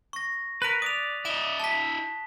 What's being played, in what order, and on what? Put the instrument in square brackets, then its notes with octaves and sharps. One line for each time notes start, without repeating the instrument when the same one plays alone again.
[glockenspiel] C#6 A#6
[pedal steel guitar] A#4 B4 [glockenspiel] F#6 B6 D#7
[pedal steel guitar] D5 [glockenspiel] D#6 F7
[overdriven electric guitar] E4 D#5 [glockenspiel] E7 G7
[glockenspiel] A5 B6